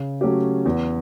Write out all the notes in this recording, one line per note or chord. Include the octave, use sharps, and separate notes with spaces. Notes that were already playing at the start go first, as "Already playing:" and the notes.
Already playing: C#3
F#3 A3 C#4 G4
E2